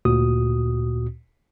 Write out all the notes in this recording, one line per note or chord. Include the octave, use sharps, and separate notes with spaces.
D2 A#2 F#4 D#6